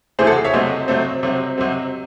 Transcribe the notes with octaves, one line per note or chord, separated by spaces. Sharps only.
C3 E3 A3 C4 G#4 C5
F#4 A4
G#4
C#5 E5
C3 F#3 A3 C4 C5 D#5
C3 F#3 A3 C4
C3 F#3 C4
C3 F#3 C4